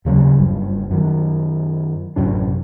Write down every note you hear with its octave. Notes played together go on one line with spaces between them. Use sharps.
D#2 C#3 E3 F#3
F#1 G2
F#2 D#3
A1 F#2 C3 D4